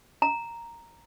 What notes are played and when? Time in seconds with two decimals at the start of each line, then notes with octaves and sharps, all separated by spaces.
0.22 A#5